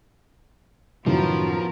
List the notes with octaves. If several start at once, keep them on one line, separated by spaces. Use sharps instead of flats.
F#2 A2 D#3 F3 B3 F#4 A#4